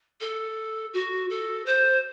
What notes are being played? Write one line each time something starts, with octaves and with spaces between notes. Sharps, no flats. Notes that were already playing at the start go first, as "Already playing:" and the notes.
A4
F#4
A4
C5